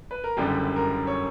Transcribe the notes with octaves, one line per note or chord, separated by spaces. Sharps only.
B4
A#4
F#1 F#2 D3 G3 G4
A#4
C#5